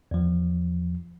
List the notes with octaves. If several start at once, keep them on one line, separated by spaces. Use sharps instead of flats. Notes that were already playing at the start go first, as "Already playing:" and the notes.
E2 F3